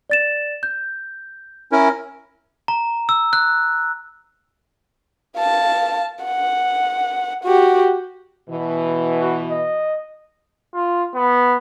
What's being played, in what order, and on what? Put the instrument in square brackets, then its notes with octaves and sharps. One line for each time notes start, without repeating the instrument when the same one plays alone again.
[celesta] D5 A6 E7
G6
[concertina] C#4 E4 A#4
[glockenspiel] A#5
E6
F#6
[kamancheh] F5 A5
F#5
F#4 G4
[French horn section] B2 E3
[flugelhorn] F#4
D#5
[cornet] F4
B3